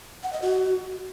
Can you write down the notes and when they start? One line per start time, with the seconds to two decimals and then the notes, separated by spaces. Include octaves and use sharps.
0.23 F#5
0.33 D#5
0.42 F#4